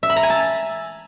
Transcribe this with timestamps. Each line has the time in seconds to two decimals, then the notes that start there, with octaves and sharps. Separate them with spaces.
0.03 E5
0.10 B5
0.16 A#5
0.23 G#5
0.30 A5